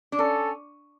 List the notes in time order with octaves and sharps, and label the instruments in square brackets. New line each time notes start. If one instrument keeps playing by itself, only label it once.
[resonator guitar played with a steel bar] D4
[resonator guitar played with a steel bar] C#4 [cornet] A4